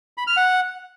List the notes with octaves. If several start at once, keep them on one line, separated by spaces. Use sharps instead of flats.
B5
F6
F#5